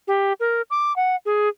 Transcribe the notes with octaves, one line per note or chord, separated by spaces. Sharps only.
G4
A#4
D6
F#5
G#4